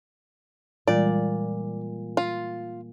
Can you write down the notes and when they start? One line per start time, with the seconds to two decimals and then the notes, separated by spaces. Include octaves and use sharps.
0.88 A#2 E3 G3 G#3 D5
2.17 F4